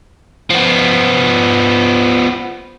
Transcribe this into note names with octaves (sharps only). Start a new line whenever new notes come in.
F3 B3